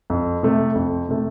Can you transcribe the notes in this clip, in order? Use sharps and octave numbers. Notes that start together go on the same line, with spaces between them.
F2
C3 A3
F2
C3 A3